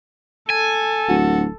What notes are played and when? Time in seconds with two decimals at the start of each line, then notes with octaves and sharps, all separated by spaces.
0.50 A4 G#5
1.09 D1 F#4